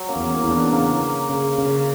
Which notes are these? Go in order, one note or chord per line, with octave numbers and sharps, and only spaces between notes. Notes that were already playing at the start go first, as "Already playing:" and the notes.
Already playing: F#3
A#3 C#4
E2
A#3 C#4
E2 C#4
B3 D4
C#3 A#3 C#4
C#3
C#3
C#3